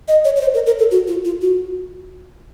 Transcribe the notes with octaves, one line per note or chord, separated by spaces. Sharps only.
D#5
C#5
C#5
C5
A#4
A#4
A4
F#4
F4
F4
F#4